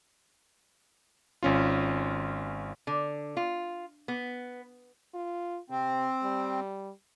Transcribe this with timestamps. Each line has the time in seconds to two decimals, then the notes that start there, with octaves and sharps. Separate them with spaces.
1.43 G#1 C#4 F4
2.87 D3
3.37 F4
4.08 B3
5.14 F4
5.70 C3 C4
6.24 G3